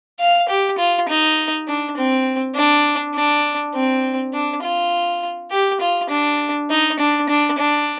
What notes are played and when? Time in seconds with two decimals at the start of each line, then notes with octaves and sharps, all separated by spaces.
0.20 F5
0.49 G4
0.78 F4
1.09 D#4
1.68 D4
1.97 C4
2.56 D4
3.15 D4
3.74 C4
4.33 D4
4.63 F4
5.51 G4
5.81 F4
6.10 D4
6.70 D#4
6.99 D4
7.29 D4
7.58 D4